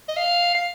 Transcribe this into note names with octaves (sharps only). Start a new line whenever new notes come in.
D#5
F5
F5